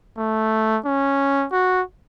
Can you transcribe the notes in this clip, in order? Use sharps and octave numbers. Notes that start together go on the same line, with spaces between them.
A3
C#4
F#4